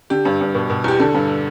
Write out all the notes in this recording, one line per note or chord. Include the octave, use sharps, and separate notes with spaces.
D3 G4
G2
G2
B2
B2
E2 G4
D3 A4
G2